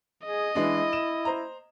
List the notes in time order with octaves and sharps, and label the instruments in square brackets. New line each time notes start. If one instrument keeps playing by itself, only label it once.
[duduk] G#4 [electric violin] D#5
[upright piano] E3 G#3 D4 [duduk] E4
[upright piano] E7
C5 A#5